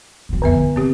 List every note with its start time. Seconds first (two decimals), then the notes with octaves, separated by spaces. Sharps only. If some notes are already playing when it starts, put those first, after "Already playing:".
0.29 B2 F#3
0.42 C2 F2 D3 B3 E5
0.57 F4
0.76 C3 C4 G4